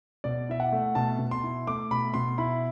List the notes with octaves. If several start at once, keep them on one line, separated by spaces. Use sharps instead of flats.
B2 D5
E4 E5
F#5
A3
B2 A5
B2
C6
E4
A3 D6
B2 B5
B2 C6
E4 B5